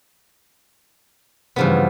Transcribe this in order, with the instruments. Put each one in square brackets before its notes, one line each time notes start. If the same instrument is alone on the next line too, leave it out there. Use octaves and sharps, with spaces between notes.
[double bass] G2 C#3 [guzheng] E3 F3 B3